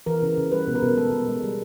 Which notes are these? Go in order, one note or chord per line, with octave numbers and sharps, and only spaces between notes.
E3 A#4
C#3
C#3
G3 B4
B2
A#4
B2
G#3 A4
B2
G#3
G3